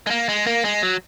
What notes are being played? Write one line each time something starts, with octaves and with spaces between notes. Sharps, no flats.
G#3
A#3
G#3
A#3
G#3
F#3